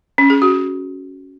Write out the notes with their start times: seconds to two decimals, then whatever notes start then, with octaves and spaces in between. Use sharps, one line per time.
0.18 C#4
0.30 G#4
0.42 F#4